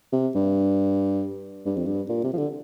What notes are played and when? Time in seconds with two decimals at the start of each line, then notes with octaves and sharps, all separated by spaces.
0.12 C3
0.35 G2
1.65 G2
1.76 F2
1.86 G2
2.09 A#2
2.24 C3
2.33 F3
2.38 D3